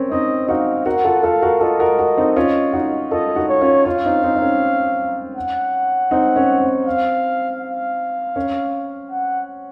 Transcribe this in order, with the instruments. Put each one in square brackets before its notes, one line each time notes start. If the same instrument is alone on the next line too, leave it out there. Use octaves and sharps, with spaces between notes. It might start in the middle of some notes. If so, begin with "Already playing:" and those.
Already playing: [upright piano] C4 C#4 A#4
[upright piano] C4 D#4 [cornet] D#5
[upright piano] D#4 F#4 [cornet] F5
[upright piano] F#4 A#4 [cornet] F#5
[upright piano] F4 A4
[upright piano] F4 A4 [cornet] F5
[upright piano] F#4 A#4
[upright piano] F4 A4 [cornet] D#5
[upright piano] F#4 A#4
F#4 A#4
C4 D#4
C#4 F4
D#4 F#4
[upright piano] F4 A4 [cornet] D#5
[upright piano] D#4 F#4
[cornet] C#5
[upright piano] C#4 F4
[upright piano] C#4 F4 [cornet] F5
[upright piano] C4 D#4
C4 D#4
D#4
C#4
[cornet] F#5
[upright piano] C4 D#4
C#4
C4
[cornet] F5
F5
[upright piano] C#4
[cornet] F#5